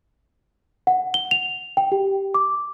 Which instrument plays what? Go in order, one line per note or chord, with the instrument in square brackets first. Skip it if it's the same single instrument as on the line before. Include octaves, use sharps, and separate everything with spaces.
[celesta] F#5
G7
F7
G5
G4
D6